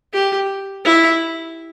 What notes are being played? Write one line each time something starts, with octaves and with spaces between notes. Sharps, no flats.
G4
E4